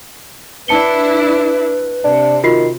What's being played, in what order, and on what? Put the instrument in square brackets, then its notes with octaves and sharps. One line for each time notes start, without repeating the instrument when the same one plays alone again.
[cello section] D4 E4 [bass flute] B4 [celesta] A5 C#7 G7
[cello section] C3 [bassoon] D4
[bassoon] D#3 [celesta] F4 F#4 C7